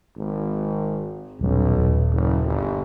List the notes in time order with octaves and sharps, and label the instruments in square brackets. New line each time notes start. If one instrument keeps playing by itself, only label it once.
[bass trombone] G#1
[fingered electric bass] D#1 G3 C#4 [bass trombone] B1
[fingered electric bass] D#1
[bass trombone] F#1
G1